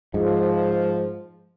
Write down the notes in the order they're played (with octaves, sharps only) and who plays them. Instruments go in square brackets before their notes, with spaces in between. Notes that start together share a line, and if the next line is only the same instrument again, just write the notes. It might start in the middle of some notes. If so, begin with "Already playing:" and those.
[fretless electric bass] G#2 [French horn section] F3